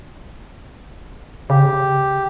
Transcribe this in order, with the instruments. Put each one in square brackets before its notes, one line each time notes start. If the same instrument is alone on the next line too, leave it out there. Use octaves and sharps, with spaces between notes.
[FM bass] C#3 [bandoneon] G4